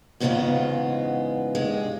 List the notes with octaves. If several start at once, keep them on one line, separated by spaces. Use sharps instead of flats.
E2 G#2 C#3 G#3 B3 F4
G2 G#3